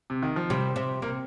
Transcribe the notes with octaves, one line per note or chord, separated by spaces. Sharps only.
C3
D#3
F3
C3 G3
C3
C3 A#3